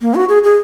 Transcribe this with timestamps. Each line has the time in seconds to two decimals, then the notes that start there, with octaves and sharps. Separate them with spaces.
0.01 A#3
0.15 F#4
0.29 G#4
0.44 G#4